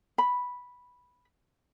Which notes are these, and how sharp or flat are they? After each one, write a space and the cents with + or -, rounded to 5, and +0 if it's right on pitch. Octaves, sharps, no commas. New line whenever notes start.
B5 -5